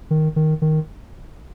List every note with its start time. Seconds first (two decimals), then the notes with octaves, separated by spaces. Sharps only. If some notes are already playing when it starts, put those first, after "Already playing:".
0.11 D#3
0.36 D#3
0.62 D#3